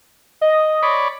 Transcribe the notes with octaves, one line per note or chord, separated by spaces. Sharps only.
D#5
C#5 D5 B5